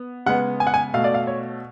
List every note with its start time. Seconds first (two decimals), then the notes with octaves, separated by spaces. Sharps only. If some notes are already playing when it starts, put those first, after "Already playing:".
Already playing: B3
0.26 C#3 G#3 B3 F#5
0.60 G#5
0.67 F#5
0.74 G#5
0.94 B2 A3 F5
1.04 D5
1.14 F5
1.27 C#5